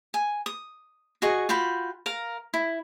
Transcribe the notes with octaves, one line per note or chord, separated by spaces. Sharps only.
G#5
D#6
F#4 G#4 D#5 C#6
F4 F#4 G5 B5
A#4 F5 A#5
E4